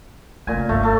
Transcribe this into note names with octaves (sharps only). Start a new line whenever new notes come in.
A#2 C#3 A3 G#5
G1 C#2 A3 F5
A3 A4